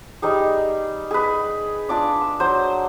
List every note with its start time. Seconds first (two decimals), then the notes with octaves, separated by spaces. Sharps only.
0.22 G3 D#4 G#4
1.11 G#4 B4
1.89 D4 F4 G#4 D5
2.21 E6
2.40 F#3 C5